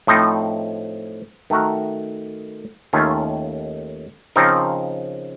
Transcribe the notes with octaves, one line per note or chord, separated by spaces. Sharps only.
A2 F3 C4 D#4
D#3 A3 D#4 F#4 A#4
D#2 D#3 A3 C#4 F4
C#3 F3 C4 D#4 A#4